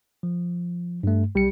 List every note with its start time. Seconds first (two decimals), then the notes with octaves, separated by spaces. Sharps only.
0.23 F3
1.03 G2 A3
1.35 B1 G3 C#7